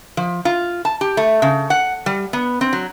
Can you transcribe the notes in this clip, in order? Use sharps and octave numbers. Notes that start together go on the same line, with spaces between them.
F3
F4
A5
G4
A3
C#3
F#5
G3
B3
C4
F#3